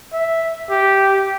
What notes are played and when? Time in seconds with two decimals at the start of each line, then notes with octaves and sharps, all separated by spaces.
0.13 E5
0.70 G4